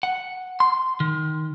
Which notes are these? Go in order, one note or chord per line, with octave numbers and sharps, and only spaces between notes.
F#5
C6
D#3